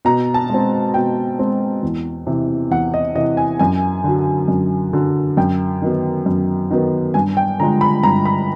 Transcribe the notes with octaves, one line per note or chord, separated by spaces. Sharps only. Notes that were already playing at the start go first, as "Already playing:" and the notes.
B2 A#5
A5
G#3 C4
B2 G5
G#3 C4
E2
C3 E3
E2 F#5
D#5
C3 E3 D#5
G#5
F#2 G#5
D3 F#3
F#2
D3 F#3
F#2 G5
D#3 F#3 B3
F#2
D#3 F#3 B3
G2 G#5
G5
D3 F3 G#3 A#5
B5
G2 A#5
B5